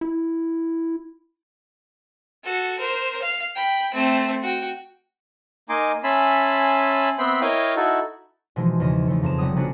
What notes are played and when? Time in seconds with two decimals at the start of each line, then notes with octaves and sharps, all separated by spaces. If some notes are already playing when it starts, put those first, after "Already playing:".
0.01 E4
2.44 F#4 A4
2.79 A#4 C5
3.22 F5
3.55 G5 B5
3.94 A3 C4
4.42 F#4 G5
5.69 A#3 D#4 D#5 G#5 C6 D6
6.04 C#4 E5 G#5 A5 B5 C6
7.18 B3 C4 E5 G5 B5 C6
7.41 E4 A#4 C#5 D#5 F5 G5
7.76 D#4 E4 F#4 A4
8.56 B2 E3 F3 G#3 D#4
8.80 E2 C#3 D#5
9.07 E2 E3 A3
9.23 F2 A#5 E7
9.38 F1 F#3 G3 B3 D#6
9.56 F#3 B3 C#4 D4 F#4